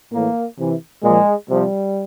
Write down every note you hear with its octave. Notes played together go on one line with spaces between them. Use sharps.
A2 E3 A#3
C3 E3
A#2 F3 G#3
C3 F3 G3